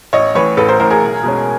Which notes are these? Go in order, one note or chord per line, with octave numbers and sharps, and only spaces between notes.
A1 C#5 D#5
A2 E3 B4 C#5
A1 A4 B4
A#4 C5
A2 E3 A#4 C5
G#4 A#4
B1
B2 G#3 C#4